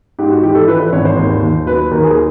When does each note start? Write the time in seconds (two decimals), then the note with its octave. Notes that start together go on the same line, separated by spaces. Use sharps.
0.19 G#2 G4
0.31 F#4
0.43 E3 G4
0.55 A4
0.68 E3 B4
0.80 C5
0.92 G#1 C#5
1.05 C5
1.17 D#2
1.43 D#2
1.66 F#3 B4
1.91 D#2 A#4
2.04 G#4